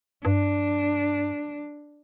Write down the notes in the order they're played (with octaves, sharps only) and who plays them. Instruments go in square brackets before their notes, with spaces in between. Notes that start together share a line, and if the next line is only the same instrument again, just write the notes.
[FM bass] G2 [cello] D4